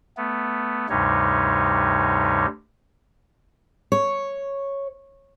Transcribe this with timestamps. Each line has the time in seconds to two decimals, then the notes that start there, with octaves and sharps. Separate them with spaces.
0.17 A3 B3
0.89 D2 G2 C3 G3 D#4 C#5
3.92 C#5